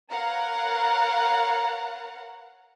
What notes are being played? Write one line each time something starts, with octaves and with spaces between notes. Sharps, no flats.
A#4 B4 C#5 F5 F#5 A#5